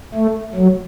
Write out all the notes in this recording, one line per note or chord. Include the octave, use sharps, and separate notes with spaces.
A3
F#3